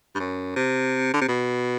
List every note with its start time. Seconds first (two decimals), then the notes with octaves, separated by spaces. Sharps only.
0.15 G2
0.20 F#2
0.56 C3
1.14 D3
1.21 C3
1.28 B2